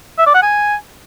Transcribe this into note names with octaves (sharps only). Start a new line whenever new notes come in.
E5
D5
F#5
G#5